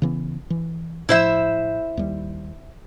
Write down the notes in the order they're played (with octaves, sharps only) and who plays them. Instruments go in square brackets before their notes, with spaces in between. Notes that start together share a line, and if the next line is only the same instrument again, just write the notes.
[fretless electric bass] C#3 E3 B3
E3
[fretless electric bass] A2 F3 [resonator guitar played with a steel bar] E4 C5 E5
[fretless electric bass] D#2 G3